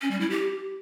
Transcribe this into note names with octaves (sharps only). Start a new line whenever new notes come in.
C#4
G3
E4
G4